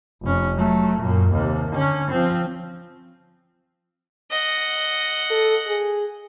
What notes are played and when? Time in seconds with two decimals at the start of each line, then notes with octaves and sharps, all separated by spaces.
0.23 F1 C#4
0.57 F#3 A3
1.00 F#2 A#2
1.32 D#2 C3
1.71 D3 C#4
2.10 F3 C4
4.30 D#5 F#5
5.31 A4
5.67 G#4